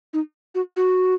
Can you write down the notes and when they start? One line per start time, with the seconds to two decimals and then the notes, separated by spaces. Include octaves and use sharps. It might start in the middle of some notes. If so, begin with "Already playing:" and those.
0.13 D#4
0.55 F#4
0.77 F#4